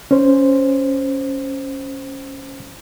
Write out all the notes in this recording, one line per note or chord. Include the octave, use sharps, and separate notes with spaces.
C#4 C5